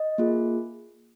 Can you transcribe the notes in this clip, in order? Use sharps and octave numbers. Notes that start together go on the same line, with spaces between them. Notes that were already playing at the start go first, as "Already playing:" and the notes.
Already playing: D#5
A#3 F4 G#4